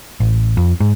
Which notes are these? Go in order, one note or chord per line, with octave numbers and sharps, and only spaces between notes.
A1
F2
G#2